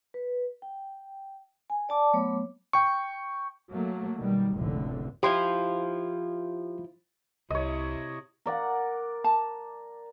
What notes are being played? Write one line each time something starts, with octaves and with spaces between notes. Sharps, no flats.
B4
G5
G#5
D5 A5 D6
F#3 A3 B3 C#5 D6
G5 C#6
F#3 A3 A#3
B1 D#3 G3
F1 C#2 A2 D3
F3 E4 F4 G4 C6
C2 C3 E4 C#5 D#5
A#4 D5 F#5
A5